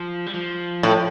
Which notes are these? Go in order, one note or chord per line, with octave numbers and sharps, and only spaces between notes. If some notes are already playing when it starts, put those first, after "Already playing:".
Already playing: F3
G3
F3
A2